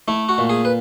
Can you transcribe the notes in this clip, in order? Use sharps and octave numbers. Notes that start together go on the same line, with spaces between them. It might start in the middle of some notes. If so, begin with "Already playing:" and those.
A3 E4
F#4
A#2
G#4
B4